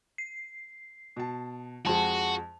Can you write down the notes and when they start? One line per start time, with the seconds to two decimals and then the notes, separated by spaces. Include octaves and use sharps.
0.18 C7
1.16 B2 A5
1.86 F2 G#3 F#4 A5